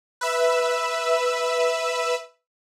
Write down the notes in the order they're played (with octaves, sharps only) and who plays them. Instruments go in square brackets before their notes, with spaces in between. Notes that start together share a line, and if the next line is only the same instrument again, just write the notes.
[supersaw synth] B4 E5 E6